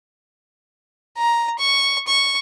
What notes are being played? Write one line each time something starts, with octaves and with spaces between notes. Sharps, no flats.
A#5
C#6
C#6